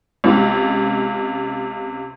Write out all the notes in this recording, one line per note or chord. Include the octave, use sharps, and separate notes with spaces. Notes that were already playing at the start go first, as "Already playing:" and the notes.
C#2 C3